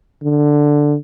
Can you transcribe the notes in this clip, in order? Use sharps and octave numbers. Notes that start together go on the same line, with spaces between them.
D3